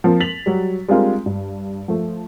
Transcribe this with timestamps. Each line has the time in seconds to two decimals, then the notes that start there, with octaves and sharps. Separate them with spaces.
0.04 F3 A#3 C4
0.20 A6 B6 F7 F#7
0.46 F#3 G3
0.88 G3 G#3 C4 D4 F4 A#4
1.26 G2
1.88 F3 A3